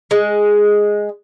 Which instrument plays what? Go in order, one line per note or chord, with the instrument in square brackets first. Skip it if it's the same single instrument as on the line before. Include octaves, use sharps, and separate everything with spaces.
[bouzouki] G#3